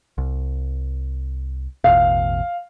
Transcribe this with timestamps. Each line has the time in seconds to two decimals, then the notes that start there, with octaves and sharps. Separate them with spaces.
0.18 C2
1.84 A1 E2 B2 F5